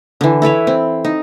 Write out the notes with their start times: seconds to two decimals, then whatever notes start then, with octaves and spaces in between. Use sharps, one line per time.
0.21 D3 E3
0.42 E4 A4 B4 C#5
0.67 C4
1.05 D#4